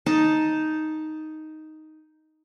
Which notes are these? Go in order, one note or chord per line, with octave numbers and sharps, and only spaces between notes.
D#4 A5